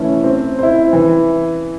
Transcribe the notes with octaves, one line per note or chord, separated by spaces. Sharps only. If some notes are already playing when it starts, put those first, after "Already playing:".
Already playing: E3 A3 C#4 E4
C4
E4 C5
E3